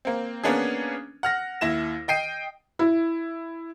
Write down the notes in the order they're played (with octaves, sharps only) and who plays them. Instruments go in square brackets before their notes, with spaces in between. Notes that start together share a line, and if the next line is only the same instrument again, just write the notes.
[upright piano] A#3 C4
A#3 B3 C#4 D4 G#4
F#5 F6 A#6
D#2 E4 A#6 E7
D#5 G5 C7 D#7
[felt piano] E4